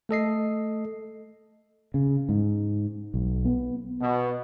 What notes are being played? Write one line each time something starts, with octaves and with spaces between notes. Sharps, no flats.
A3 A4 D#5 C7
C#3
G#2
B1
B3
B2